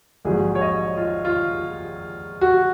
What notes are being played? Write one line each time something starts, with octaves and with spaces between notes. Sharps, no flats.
A#1 G#2 F#3 G#4
C#5
D#5
F4
F4
F#4